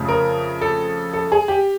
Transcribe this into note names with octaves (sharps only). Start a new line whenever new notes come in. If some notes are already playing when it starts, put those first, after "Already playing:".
Already playing: F2 C#3 F3 A3
A#4
A4
A4
G#4
G4